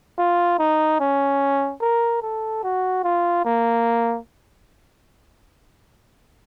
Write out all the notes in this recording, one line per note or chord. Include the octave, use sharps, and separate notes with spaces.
F4
D#4
C#4
A#4
A4
F#4
F4
A#3